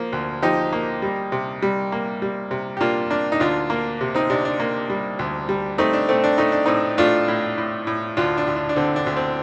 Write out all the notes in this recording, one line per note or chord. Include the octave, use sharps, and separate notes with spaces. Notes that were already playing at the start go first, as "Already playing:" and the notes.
Already playing: F3 A#3
D2
F3 D#4 G4
A#3
G3
C3
G3
A#3
G3
C3
G4
A#3 D4 F4
A#3 D4
D#4
D2 D4 F4
A#3
C3
C4 D#4
C3 D4
D4
A#3
G3
D2
G3
A3 C4 D#4
D4
A3 C4
D4
A3 D#4
D4
A2 C4 D#4
A3 D4 F4
A2
A2
A2
D2 D4 F4
D4
D2
D4
D4
D3 C4
D4
D2
C4